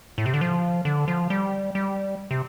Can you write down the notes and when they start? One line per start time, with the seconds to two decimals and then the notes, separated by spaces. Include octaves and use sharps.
0.18 A2
0.26 C3
0.34 D3
0.41 F3
0.85 D3
1.08 F3
1.30 G3
1.75 G3
2.31 C3